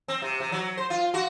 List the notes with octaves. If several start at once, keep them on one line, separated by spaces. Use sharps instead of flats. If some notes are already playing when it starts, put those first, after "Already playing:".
C4
C3
C3
F#3
C5
F4
F#4